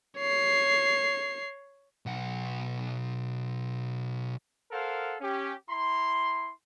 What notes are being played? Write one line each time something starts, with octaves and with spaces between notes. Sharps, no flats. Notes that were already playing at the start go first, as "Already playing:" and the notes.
C#5 C7
B1 F#5
A4 A#4 C5 F5 F#5
C#4 G4
E4 A#5 C6